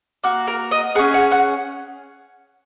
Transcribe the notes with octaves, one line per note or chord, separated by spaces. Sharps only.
A#3 F#4
A#4
D#5
C#4 G#4 F#5
F#5
F#5